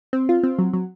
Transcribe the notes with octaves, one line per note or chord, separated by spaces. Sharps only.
C4
F4
C4
F#3
F#3